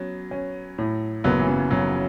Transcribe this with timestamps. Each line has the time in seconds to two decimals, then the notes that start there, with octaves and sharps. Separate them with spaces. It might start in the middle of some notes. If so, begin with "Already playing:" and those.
Already playing: F#3 B3 C#4
0.31 C#4
0.78 A2
1.24 F#1 F#3 B3
1.39 E3
1.48 C#3 F#3
1.71 F#2 C#3 F#3